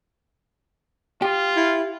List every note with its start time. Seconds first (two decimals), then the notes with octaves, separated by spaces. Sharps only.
1.22 F4 G4
1.56 E4